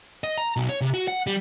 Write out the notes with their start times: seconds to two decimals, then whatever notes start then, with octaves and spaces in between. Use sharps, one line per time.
0.24 D#5
0.38 A#5
0.56 B1
0.69 C#5
0.81 C3
0.94 F#4
1.08 F#5
1.27 G3